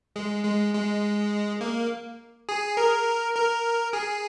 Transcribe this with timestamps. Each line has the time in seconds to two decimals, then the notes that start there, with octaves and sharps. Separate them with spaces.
0.16 G#3
0.44 G#3
0.74 G#3
1.61 A#3
2.49 G#4
2.77 A#4
3.36 A#4
3.93 G#4